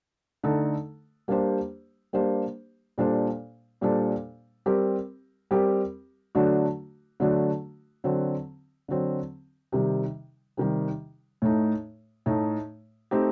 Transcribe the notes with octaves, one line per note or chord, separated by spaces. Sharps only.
D3 A3 D#4 A4
G3 A#3 D4 G4 C5
G3 A#3 D4 G4 C5
A#2 G3 D4 A4 C5
A#2 G3 D4 A4 C5
G3 C4 G4 A#4
G3 C4 G4 A#4
D3 F#3 A3 D4 F#4
D3 F#3 A3 D4 F#4
D3 F#3 C4
D3 F#3 C4
C3 D#3 G3
C3 D#3 G3
A2 A3 D#4
A2 A3 D#4
A3 C4 D#4 G4